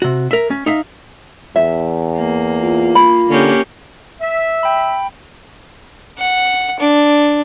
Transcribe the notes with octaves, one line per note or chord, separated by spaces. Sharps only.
C3 F#4
A#4 E5
C#4
D#4 E5 F5
E2 E5
A#3
F4
B5
D3 A#3 C#4 G4
E5
G5 B5
F#5
D4